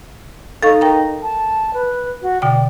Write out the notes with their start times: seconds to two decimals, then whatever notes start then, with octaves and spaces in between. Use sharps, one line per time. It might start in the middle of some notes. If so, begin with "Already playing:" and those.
0.63 D#4 A4 F5 C#6
0.81 A#4 G5 A#5
1.23 A5
1.74 B4
2.22 F#4
2.42 B2 D3 D5 G5